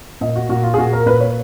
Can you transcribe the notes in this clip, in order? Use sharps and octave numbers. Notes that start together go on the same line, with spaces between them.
A#2 D#5
F#4
A#2 F#4
F4
G#4
A#2 F#4
A#4
A#2 B4
C#5